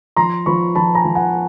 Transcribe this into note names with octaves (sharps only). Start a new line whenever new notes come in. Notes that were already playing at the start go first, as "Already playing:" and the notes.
F3 A#5 C6
F3 B5 C#6
F3 A5 B5
G#5 A#5
F3
F#5 G#5